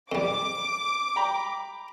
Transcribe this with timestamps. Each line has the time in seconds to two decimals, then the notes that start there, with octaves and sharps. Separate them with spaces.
0.12 F2 G3 D6
1.16 G5 A#5 B5